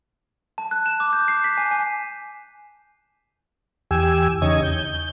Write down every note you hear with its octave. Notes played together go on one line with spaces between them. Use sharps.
A5
F#6
E7
D6
G6
C7
B6
G#5
G#5
E2 G4 G#5 E6
E2 C#3 D#4 C#5 D#5 G#6
G6